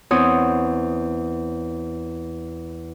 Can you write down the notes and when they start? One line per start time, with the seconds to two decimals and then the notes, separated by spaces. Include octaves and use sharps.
0.11 E2 C4 C#5 C6 D#6